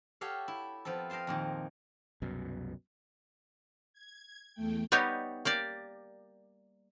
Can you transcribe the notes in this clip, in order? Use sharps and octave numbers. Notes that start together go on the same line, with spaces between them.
F#4 G4 A4 C#5 F5
E4
F3 B3 C4 A4
D#5 F5 G5 A5 C6
F2 A#2 D#3
C2 F#2 B2
G#6
E2 A3 G5
G3 B3 D#4 G4 C#5
A#3 G4 D5